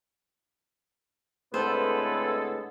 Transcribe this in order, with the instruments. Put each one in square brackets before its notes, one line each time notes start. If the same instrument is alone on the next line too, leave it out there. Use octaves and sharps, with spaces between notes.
[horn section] A2 D3 G#3 [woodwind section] B3 C4 A4 [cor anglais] B4 [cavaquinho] C5